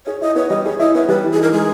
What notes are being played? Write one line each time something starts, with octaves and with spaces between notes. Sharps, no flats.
G#4 C#5
E4 D#5
B3 C#5
G3 D#5
G#4 C#5
E4 D#5
B3 C#5
G3 B4
E3
G#4
D#4 A#4
G#3 G#4